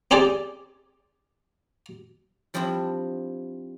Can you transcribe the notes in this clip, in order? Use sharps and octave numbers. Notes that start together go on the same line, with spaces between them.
C4 C#4 G4 G#4 D5
F3 G3 C4 D4 E4